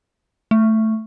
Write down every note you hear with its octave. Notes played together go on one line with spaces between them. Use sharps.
A3